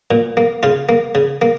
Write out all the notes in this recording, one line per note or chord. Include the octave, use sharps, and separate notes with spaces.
A#2
A#3
C#3 F4
A#3
C#3
A#3